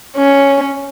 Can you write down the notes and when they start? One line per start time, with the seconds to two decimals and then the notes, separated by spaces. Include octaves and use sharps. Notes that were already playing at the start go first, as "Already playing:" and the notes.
0.16 C#4